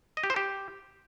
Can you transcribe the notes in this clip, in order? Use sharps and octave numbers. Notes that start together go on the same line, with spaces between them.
D#5
G4
C5
G4